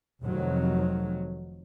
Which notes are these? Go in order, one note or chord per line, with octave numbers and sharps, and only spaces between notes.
F1 F2 D#3 F#3